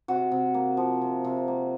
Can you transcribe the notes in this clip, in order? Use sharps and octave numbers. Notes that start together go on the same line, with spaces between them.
C3 F#4
C3
A#3
F3
C3
C3
A#3